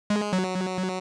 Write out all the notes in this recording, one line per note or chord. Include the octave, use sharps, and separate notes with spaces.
G#3
F#3